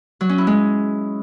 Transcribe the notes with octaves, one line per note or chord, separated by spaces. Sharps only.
F#3
C#4
E4
G#3